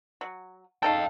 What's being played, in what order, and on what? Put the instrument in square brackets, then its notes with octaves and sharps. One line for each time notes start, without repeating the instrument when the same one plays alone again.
[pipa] F#3
[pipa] C#3 D#4 A4 [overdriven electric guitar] F5 G5